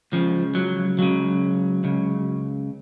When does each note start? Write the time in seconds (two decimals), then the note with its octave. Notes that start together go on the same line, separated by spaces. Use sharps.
0.12 C#2 C#3 F3
0.55 F#3
0.98 C#2 C#3 F#3
1.84 C#2 C#3